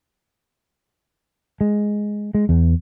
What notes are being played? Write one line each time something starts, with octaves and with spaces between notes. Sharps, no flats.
G#3
G#3
E2